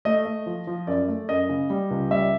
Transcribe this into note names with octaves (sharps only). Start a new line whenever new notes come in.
A3 D#5
A3
F3
F3
F#2 D5
A3
F#2 D#5
C#3
G3
C#2
G3 E5